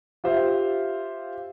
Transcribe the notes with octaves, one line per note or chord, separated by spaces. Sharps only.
F4 G4 C5 E5 F5